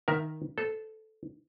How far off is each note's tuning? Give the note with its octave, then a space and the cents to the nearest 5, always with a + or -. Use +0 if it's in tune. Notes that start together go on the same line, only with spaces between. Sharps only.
D#3 +0 A#4 +10 E5 +0
A4 -10 C5 -35